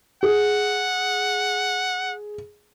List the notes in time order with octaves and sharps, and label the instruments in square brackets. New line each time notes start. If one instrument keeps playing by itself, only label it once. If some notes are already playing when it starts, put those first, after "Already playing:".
[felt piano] G#4 [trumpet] F#5